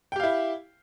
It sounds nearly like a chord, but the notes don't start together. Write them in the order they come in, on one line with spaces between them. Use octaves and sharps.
G5 G4 F5 E4